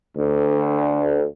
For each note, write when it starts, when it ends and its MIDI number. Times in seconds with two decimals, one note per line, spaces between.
0.17 1.25 38